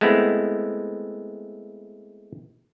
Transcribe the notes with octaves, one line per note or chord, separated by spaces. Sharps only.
G#3 A3 B3 C4 E4 F#5